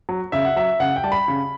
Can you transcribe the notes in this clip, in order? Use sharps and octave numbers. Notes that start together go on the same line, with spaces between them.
F#3
C#3 E5
F#5
F#3 E5
C#3 F#5
G5
G3 A5
B5
C#3